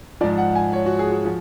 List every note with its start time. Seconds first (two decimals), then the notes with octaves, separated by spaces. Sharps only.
0.21 F3 D5
0.24 G#2
0.38 F#5
0.55 G#5
0.73 C#5
0.86 F#4
0.99 G#4
1.12 F#4
1.25 F3